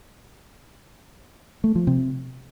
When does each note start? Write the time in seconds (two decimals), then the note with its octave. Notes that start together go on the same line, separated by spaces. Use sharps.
1.64 A3
1.75 F3
1.87 C3